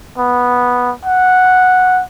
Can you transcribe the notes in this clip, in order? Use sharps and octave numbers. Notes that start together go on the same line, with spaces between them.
B3
F#5